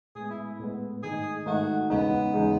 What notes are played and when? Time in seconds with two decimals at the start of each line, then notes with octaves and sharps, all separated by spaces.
0.15 A2 G#3 B3 G#4
0.30 E4
0.60 A2 G#3 B3
1.03 G#2 D#3 A3 D#4 G#4
1.46 G#2 D#3 A3 D#4 F#4
1.90 E2 C#3 G#3 B3 D#4
2.34 E2 C#3 G#3 D#4